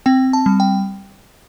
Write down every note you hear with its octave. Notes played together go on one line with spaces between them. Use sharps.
C4 G5
A5
G3
G5